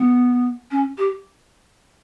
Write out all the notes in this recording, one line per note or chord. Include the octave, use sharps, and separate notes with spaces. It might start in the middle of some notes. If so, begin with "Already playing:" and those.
Already playing: B3
C#4
G4